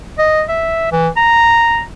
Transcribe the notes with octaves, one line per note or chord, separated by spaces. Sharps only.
D#5
E5
E3
A#5